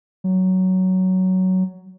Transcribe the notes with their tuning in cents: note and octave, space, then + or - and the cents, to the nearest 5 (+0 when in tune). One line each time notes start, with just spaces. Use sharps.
F#3 +10